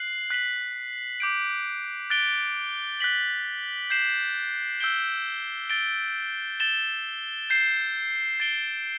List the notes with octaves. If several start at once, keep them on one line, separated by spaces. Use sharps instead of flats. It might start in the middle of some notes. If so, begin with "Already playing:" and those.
Already playing: F#6 C7 F#7
F#6 B6 F#7
D6 G6 D7
F#6 A6 D7 G7
F#6 B6 F#7
G6 C7 E7
E6 G6 D7 G7
A6 D7 G7
A6 E7 G7
G6 C7 E7
A6 D7 G7